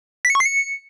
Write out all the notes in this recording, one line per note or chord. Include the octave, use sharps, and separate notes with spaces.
B6
C#7
C#6
C7
C#7